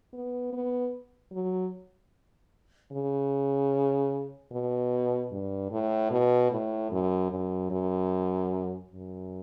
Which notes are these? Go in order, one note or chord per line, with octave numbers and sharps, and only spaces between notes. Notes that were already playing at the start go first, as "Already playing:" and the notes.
B3
B3
F#3
C#3
B2
G2
A2
B2
A2
F#2
F#2
F#2
F#2